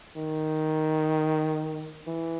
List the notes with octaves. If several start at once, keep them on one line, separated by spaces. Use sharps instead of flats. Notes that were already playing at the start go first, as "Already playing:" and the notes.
D#3
E3